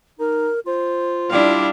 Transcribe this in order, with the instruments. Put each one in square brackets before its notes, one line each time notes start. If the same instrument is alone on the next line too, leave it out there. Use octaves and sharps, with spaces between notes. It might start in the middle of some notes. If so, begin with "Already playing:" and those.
[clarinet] D#4 [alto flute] A#4
[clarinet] F4 [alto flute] C5
[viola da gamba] G3 D4 [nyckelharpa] E4 F5